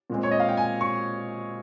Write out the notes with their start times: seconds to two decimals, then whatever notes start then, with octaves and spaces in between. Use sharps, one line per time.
0.10 A#2 G#3 C4
0.23 C#5
0.31 D#5
0.40 F5
0.48 G5
0.57 G#5
0.81 C#6